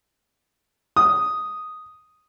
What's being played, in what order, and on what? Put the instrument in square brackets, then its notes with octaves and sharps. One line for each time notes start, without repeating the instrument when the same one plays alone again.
[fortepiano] D#6